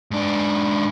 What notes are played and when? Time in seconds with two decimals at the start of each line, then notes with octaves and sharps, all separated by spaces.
0.11 G#2 D4